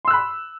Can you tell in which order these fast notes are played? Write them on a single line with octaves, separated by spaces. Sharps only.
C6 E6 F#6 B5